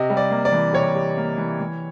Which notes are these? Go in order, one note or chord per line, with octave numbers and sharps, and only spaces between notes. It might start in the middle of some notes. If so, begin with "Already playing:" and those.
Already playing: C3 D#5
G3
D5
A#3
D5
E3
C3 C#5
G3
A#3
E3
E3